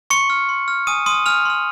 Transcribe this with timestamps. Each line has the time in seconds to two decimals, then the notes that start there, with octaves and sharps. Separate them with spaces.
0.10 C6 C#6 C#7
0.30 F6
0.49 C6
0.68 F6
0.87 G#5 D#6 D#7
1.06 C6 D#6 F6 D#7
1.26 G#5 F6 F7
1.45 C6 F6